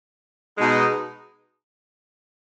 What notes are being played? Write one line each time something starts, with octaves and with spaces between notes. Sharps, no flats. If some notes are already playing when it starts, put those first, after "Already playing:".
B2 G#3 D#4